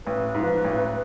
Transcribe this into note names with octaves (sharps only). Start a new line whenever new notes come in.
A1 B4
G#2
F3
A1